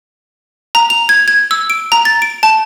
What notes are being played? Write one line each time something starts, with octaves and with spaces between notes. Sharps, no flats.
A#5
F7
G#6
G#6
E6
D7
A#5
A6
D7
A5